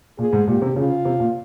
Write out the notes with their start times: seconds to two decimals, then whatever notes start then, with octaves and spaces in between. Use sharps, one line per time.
0.18 A#2 G#4
0.33 G#2
0.47 A#2 G4
0.62 C3
0.76 C#3 F4
1.05 C3
1.20 A#2